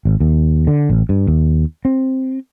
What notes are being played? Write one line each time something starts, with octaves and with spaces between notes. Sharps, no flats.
G#1
D#2
D3
A1
G2
D#2
C4